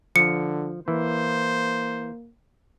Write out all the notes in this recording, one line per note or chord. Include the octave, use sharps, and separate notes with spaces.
D3 F3 C#7
E3 A#3 C5